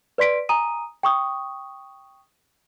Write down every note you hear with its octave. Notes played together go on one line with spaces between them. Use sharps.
B4 D5 C6 B6 D7
G#5 A#5 D#6 D#7
G5 C#6 D#6